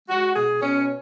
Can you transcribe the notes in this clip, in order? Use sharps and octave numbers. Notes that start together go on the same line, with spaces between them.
G#3 F#4
B2 G#4
B2 C#4